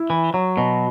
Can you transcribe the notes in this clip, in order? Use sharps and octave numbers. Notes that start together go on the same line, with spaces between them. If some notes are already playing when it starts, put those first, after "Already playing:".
Already playing: E4
E3
F#3
B2